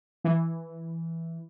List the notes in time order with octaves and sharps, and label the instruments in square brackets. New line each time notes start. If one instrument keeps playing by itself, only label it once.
[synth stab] E3